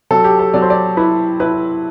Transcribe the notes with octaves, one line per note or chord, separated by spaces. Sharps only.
F#3 A4
G4
A4
F#3 D5
C5
D5
E4 B4
E4 B4